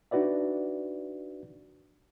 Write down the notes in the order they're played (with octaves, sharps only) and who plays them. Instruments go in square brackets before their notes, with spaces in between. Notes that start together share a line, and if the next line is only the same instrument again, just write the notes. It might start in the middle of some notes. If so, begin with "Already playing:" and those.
[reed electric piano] D4 D#4 F#4 B4 D5 E5